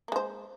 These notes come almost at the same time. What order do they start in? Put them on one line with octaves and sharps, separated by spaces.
A#3 G#3 C5